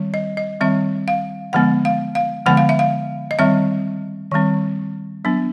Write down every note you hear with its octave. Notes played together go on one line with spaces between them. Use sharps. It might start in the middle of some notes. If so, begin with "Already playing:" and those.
Already playing: D#3 G3 C4
D#5
D#5
D#3 G3 C4 E5
F5
D3 F3 G#3 B3 F#5
F5
F5
D3 F3 G#3 B3 F#5
F5
E5
F5
D#5
D#3 G3 C4 E5
D#3 G3 C4
F#3 B3 D4